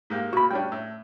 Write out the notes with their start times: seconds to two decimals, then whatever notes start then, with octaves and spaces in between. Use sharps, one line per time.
0.10 G#2 A#3 G4
0.33 A#2 F#4 B5
0.51 G3 C#4 D4 G5
0.72 A2